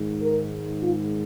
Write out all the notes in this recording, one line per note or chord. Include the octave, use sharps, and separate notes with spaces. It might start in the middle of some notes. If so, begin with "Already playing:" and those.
Already playing: G#2 D#3 G#3
A#4
F4